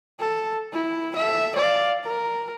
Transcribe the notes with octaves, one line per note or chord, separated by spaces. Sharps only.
A4
E4
A4 E5
D5 F5
A#4